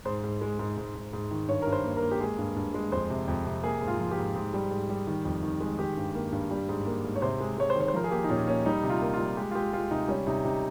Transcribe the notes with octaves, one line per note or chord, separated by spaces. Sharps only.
G#2 C5
G#2
G#3
G#2
G#2
G#2
G#2
D#3
G2 C#5
G2 A#4
C5
A#3
A#4
A#3
G4
G#3 G#4
G2
G2
G#3
F2 C5
C3
F2
C3
A#3 G#4
G#2
F4
F3
G4
G#2
G#2
G3
G#2
G3
D#3
F2
D#3
G#3
D#3 G4
G2
A#3
G2
G3
G#2
A#3
G#2
C#5
C3 C5
G#3
G#3 C#5
C5
D#3 C#5
C5
F3 A#4
G#4
A#3 G4
D#4
A#2 C#4
A#3 C#4
G3 D#4
C3
F4
A#3
F4
G3
G#3 G4
F4
G#3 G4
G#3 F4
C3 D#4
G3 C#4
C3 D#4
C3 D#4